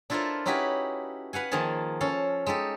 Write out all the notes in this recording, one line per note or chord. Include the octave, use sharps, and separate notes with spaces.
D4 E4 F4 A4 A#4 C5
C#4 D#4 E4 F#4 G4 B4
B4 F5 F#5 G#5
D#3 F3 A#3 G#4 G#5 A5
C#4 A4 F5
G#3 D#4 G4 A4